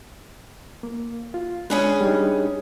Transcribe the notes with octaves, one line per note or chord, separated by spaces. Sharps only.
A#3
F4
G#3 C#4 D4 G#4 B4
G3 D4 D#4